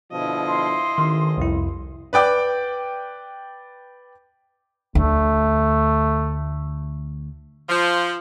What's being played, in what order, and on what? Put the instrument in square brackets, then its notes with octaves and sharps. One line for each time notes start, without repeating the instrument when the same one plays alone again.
[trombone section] B2 D3 F3 [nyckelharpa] E4 D#5
[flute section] C6
[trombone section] A1 [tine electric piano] D#3
[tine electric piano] C2 F2 E4
[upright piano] B4 D5 G5 D6
[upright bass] D2 [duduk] A3
[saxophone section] F3